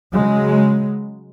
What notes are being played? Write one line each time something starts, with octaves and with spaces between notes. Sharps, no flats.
C#3 F#3 G#3